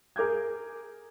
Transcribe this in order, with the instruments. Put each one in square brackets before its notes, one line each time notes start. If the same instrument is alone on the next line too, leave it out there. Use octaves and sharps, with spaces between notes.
[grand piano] G#4 A#4 D6 G6 G#6